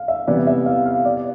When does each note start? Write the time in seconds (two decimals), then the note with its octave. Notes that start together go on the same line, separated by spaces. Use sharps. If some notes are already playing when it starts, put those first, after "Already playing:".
Already playing: F5
0.08 E5
0.27 C3 E3 G3 B3 E4 D5
0.47 E5
0.66 F5
0.86 F5
1.05 D5